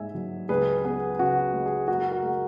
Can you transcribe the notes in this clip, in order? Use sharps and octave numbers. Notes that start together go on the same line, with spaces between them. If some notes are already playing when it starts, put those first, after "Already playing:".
Already playing: G#2 A#3 E5 G#5
F#3
C#2 G#4 B4
B3 G#4
C#3 F#4
G#3
G#4
F#1 F#4 A#4
F#4 A#4
G#3